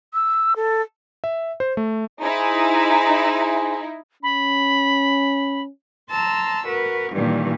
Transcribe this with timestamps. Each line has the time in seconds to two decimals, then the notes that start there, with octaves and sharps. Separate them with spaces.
0.14 E6
0.56 A4
1.24 E5
1.60 C5
1.77 A3
2.21 D#4 E4 G#4 C5 G#5
4.23 C#4 B5
6.09 A5 A#5 C6 E6
6.66 F#4 A#4 B4
7.12 G2 A#2 D#3 E3 G3